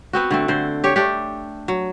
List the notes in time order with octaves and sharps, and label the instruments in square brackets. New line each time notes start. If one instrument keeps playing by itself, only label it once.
[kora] B3 C4 F#4
D3 A3 C4
D3 C5
G4 C#5
A3 D4 G4
F#3